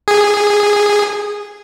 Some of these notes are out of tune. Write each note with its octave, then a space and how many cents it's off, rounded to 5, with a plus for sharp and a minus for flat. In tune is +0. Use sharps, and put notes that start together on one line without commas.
G#4 -10